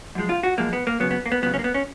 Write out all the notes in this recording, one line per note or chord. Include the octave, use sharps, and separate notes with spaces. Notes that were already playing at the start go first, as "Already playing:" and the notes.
F#2 F3 G#3
F4
F#4
F#2 F3 G#3 A#3
B3
A#3
C#2 C#3 F#3 B3
B3
A#3
B3
C#2 C#3 F#3 B3
C#4
A#3
B3
C#4